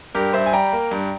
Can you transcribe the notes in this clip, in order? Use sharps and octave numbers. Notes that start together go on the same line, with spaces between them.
G2 G4 A#4
G2 C5 E5
G#5
G3 G5 A#5
A#3
G2